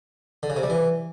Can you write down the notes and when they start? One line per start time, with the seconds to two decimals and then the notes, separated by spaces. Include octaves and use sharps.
0.43 D3
0.50 C#3
0.57 C3
0.63 G3
0.70 E3